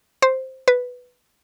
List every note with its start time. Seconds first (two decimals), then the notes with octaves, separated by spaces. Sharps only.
0.22 C5
0.68 B4